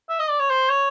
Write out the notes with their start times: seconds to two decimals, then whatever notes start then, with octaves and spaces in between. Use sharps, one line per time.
0.09 E5
0.20 D#5
0.30 D5
0.40 C#5
0.50 C5
0.70 C#5